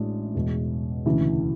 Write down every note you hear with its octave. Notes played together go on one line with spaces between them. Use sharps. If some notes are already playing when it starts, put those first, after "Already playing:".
Already playing: A1 A2 G#3 D4 F#4
E2 B2 G#3
E1 D2 C#3 E3